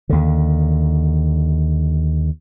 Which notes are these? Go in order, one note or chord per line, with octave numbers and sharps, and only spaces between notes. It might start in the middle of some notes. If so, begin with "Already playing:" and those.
D#2 D3